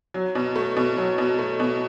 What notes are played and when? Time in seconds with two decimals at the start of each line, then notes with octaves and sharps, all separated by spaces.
0.14 F#3
0.35 B2
0.56 A3
0.77 B2
0.97 F#3
1.18 B2
1.39 A3
1.60 B2